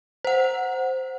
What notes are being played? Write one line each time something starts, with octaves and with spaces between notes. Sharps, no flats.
C5 F#5